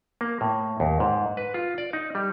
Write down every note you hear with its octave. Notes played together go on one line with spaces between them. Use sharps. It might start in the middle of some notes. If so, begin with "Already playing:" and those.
A#3
A2
D#2
G#2
B4
F4
D5
D#4
G3